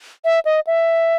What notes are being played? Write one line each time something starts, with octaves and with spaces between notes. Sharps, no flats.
E5
D#5
E5